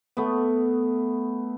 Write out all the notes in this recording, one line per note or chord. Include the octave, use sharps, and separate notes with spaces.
A3 B3